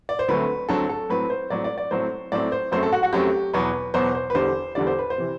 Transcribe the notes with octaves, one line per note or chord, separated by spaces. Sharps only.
D5
C5
D2 D3 F#3 A3 C4 B4
D2 D3 F#3 A3 C4 A4
A4
A2 F#3 C4 B4
C5
A2 F#3 C4 D5
D5
D5
A2 F#3 A3 C4 C5
A2 F#3 A3 C4 D5
C5
F#2 F#3 A3 C4 C5
A4
F#4
F#4
F#2 F#3 A3 C4 G4
E2 B2 F#3 B3 B4
E2 B2 F#3 B3 C5
C5
B4
E2 D3 G3 C5
E2 D3 G3 D5
C5
B4
C5
C3 E3